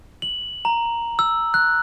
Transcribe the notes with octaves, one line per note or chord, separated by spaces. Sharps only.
F#7
A#5
E6
F#6